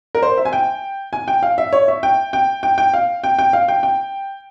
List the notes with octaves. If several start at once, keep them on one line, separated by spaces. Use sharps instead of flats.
A#4
C5
E5
G#5
G5
G#5
G5
F5
E5
C#5
E5
G5
G5
G5
G5
F5
G5
G5
F5
G5
G5